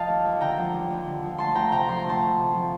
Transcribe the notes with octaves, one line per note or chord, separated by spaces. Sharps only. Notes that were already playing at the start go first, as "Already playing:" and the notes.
Already playing: F3 D#5 F5 G5 A5
D#2
D#2
D3 G5 A#5
F3
D#2
D#2
D3
F3
D2 A5 C6
D2 G5 A#5
C3 G5 A#5
F3 C6
A#5
D2
A5 C6
D2
C3
F3